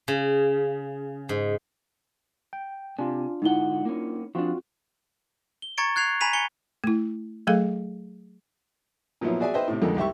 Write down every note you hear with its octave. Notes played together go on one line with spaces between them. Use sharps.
C#3
G#2
G5
C3 D4 F4 G#5
G#2 D3 D#4 E4 F#5 G7
A#3 C#4
F3 C4 D4 F4 F#4
G7
A#5 C#6 G#6 A6 C#7 D7
F#6 G#6 C7 F7
G#5 A#5 B5 B6 D#7 F7
G#5 C#7 G7
A3 E4
F#3 A3 G#4 A4 F5
A#2 F3 F#3 B3 E4
F#4 G#4 D5 E5 G#5
B4 C5 D#5 E5 G5
A2 C3
F2 D3 D#3 G#3
C2 G4 E5 C#6